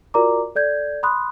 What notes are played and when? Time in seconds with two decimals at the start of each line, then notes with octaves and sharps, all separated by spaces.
0.14 F4 F#4 A#4 D5 A#5 D6
0.55 A4 D5 G6 G#6
1.03 B5 C6 D#6 F#6